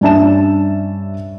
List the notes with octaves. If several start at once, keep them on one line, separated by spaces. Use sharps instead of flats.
G2 C#4 D4 E5 A5 E7